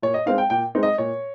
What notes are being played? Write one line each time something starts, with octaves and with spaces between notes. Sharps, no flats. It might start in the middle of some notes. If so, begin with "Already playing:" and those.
A#2 C#5
D#5
G#3 C4 D#4 F5
G5
A#2 G5
G#3 C4 D#4
D#5
A#2 C#5